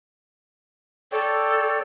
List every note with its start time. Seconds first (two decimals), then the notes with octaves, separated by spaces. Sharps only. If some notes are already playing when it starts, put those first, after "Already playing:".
1.12 A4 C#5 D5 G5